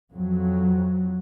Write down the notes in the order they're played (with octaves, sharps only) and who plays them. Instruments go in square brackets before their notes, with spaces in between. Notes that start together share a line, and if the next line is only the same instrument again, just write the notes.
[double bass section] F2 F#3